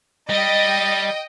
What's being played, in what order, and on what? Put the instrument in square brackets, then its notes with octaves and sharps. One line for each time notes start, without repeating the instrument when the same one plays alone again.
[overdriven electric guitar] G3 [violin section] D#5 G5